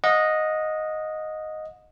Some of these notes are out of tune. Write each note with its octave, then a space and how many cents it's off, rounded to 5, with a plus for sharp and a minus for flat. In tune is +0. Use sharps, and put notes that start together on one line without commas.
D#5 +0 F#5 -35